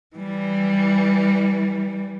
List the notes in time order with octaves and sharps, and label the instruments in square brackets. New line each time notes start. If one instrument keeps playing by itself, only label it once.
[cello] E3 G3